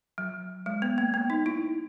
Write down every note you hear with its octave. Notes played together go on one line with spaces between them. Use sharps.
F#3
G#3
B3
A#3
B3
D#4
E4